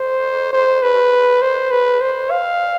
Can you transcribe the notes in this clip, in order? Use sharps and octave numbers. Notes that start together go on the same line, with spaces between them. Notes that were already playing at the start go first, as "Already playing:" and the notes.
Already playing: C5
C5
B4
C5
B4
C5
F5